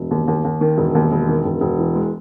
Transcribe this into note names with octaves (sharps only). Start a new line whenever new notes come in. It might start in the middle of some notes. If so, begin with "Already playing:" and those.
Already playing: E1
D#2
D#2
D#2
D#3
E1
D#2
E1
D#3
E1
E1
E3
G#3